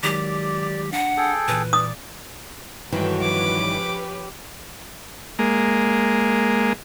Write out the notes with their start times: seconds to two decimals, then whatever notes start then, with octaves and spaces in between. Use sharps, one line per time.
0.03 D#3 F#3 G#3 G4 D5
0.92 D4 F#5
1.17 G#4 A4 G5
1.48 A#2 E3 B4
1.73 D5 D#6
2.92 G2 D#3 E3 G#3 F#4 A4 C#5 G5
3.21 F3 C#4 B4 D6
3.60 G4
5.39 G#3 A#3